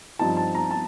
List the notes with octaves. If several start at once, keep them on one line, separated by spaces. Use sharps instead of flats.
G2 F3 C4 D#4 A5
A5
A#5
A5